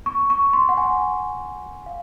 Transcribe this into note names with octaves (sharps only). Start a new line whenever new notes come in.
C#6
C#6
C6
F#5
G#5
F5